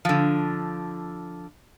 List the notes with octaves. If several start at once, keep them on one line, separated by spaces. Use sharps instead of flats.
D3 F3